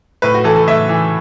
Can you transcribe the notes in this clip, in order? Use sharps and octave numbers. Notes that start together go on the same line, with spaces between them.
A2 B4
F#4
E3 A4
A4
A2 E5
E3